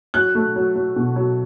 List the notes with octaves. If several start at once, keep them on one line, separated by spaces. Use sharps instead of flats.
F#3 F#6
A3
F#3
F#3
B2
F#3